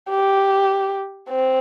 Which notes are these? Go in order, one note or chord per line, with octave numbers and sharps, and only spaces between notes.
G4
C4